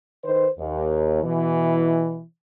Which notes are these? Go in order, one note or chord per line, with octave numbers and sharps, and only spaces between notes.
D#3 B4 C5
D#2
B2 E3